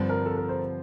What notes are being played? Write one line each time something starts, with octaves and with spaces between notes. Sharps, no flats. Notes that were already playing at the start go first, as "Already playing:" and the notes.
Already playing: G2 D3 F3 C4 C5
A#4
A4
A#4
C5